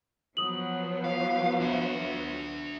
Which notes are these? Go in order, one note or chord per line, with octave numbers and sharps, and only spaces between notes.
F3 F#3 B3 D#6 F#7
F5
D4 E5